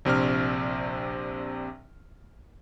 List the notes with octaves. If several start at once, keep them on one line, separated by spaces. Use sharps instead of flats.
A#1 C3 C4 D4 F6